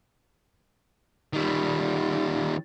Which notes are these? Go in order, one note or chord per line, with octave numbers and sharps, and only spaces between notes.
D#3 G3